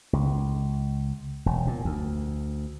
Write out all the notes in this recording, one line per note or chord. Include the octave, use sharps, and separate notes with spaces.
C#2
E1
A#2
D2